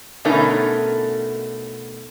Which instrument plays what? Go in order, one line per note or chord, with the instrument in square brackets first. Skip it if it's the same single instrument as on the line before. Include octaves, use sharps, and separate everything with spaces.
[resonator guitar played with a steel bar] B2 D3 A3 C#4 D#4 A#4